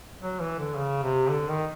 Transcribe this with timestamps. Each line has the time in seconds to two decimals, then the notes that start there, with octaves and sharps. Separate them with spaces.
0.22 F#3
0.40 E3
0.59 D3
0.76 C#3
1.03 C3
1.30 D3
1.48 D#3